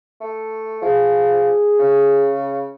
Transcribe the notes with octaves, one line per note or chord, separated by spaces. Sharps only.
A3
F3 G#4
C#3